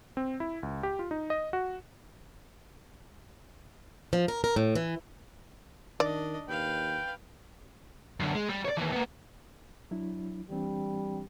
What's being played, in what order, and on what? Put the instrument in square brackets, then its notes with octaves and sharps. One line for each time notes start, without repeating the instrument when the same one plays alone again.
[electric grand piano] C4
E4
C#2
G4
F4
D#4
D#5
F#4
[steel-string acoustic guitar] F3
A#4
A#4
A2
E3
[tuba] D#3 [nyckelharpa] D4 D#5 [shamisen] D5
[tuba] D#2 [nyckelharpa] B4 F5 [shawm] G5
[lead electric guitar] F#2 D3
G#3
G3
C#5 D5
D#2 E3
A#3 B3
[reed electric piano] F#3 D4 E4
[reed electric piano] E3 C4 D4 [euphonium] G3